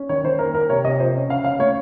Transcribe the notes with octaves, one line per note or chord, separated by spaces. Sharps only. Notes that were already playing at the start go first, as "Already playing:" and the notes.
Already playing: C#4
D#3 C#5
D#3 C5
A#3 A#4
A#3 A#4
C3 C#5
C3 D#5
F3 C5
C#4
C#3 F5
C#3 F5
A3 C#5